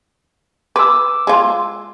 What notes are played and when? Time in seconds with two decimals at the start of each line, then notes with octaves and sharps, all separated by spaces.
0.76 B4 D6 E6
1.27 G#3 F4